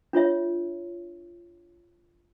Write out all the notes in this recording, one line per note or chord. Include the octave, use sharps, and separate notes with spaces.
D4 F4 C#5 E5